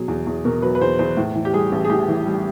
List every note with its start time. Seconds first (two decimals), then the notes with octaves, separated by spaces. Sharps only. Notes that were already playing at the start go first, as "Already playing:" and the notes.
Already playing: B2 F#3 G#4
0.08 E2
0.27 E2
0.45 B2 A#4
0.62 F#3 B4
0.75 B4
0.81 E2 C5
0.99 E2 C5
1.17 A2
1.35 E3
1.45 G4
1.53 G3 G#4
1.72 A1
1.85 G#4
1.90 A2 G4
2.08 E3
2.26 G3